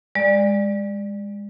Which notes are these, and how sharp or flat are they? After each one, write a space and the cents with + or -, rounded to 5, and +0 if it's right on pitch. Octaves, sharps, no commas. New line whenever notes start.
G#3 -30 D5 +10